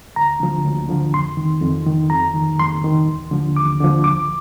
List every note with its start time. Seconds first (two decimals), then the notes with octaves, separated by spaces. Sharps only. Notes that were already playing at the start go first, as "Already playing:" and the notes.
0.16 D2 A#5
0.40 D3 F3
0.65 D2
0.89 D3 F3
1.14 F2 C6
1.37 D#3
1.61 F2
1.87 D#3
2.10 F2 A#5
2.34 D#3
2.60 F2 C6
2.84 D#3
3.07 D#2
3.31 D3 F3
3.56 D#2 D6
3.81 D3 F3
4.04 D2 D6